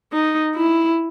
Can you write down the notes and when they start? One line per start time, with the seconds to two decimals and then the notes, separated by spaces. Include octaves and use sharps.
0.13 D#4
0.55 E4